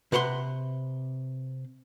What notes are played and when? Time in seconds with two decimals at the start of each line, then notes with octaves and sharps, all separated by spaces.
0.12 C3 B4 F#5 A#5 C6